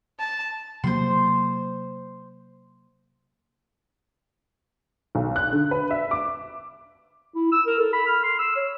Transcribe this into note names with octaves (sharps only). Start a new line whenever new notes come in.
A5
C3 F#3 A#3 C5 C6
B1
F#6
D3
B4
E5
D6
E4
E6
A#4
A4
B5
F6
C6
E6
C#5